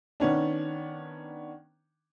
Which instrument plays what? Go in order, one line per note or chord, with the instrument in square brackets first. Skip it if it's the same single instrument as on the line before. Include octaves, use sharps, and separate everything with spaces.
[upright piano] D#3 B3 C#4 D4